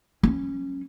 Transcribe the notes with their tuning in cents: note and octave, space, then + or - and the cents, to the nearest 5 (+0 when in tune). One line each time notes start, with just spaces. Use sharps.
F#3 +20 C#4 -15